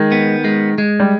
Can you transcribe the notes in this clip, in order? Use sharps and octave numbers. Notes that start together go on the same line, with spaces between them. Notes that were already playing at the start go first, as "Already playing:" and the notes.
Already playing: D#3 G#3
B3
G#3
G#3
G3